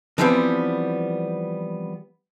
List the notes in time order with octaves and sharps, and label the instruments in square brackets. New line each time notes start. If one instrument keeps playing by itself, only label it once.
[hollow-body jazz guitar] D3 E3 F3 G3 B3 C4